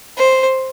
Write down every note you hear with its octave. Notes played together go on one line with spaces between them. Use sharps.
C5